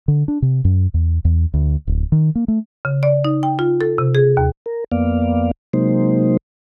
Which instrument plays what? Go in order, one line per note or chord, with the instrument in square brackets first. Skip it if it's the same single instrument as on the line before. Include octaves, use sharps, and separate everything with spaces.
[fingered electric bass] D3
D4
C3
F#2
E2
E2
D2
D1
D#3
A#3
A3
[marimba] C#3
D5
D#4
G5
F4
A4
C3
G#4
D#2
[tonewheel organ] A#4
F2 A#3 B3 D5 F5
C3 F#3 G#3 A#3 D#4 C5